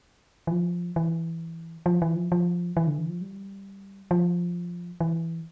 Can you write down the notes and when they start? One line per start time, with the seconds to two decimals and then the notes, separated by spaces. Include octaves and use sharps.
0.47 E3
0.51 F3
0.96 E3
1.86 F3
2.02 E3
2.16 F3
2.32 F3
2.77 E3
2.87 D3
2.98 E3
3.09 F3
3.21 G3
4.11 F3
5.00 E3